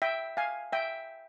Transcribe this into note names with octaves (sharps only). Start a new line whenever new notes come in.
E5 G5
F5 G#5
E5 G5